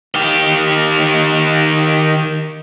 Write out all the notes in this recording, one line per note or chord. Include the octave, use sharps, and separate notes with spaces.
D#3 G4